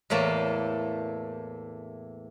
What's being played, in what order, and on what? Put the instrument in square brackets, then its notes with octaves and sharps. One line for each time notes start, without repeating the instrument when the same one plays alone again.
[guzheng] E2 A2 A3 A#3 A5